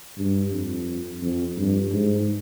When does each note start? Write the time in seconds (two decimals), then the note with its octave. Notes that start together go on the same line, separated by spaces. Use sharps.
0.17 G2
0.51 F2
1.22 F2
1.57 G2
1.92 G#2